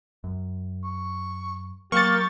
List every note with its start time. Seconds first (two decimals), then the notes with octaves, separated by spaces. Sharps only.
0.24 F#2
0.84 C#6
1.92 F#3 A#3 G4 C#6 A6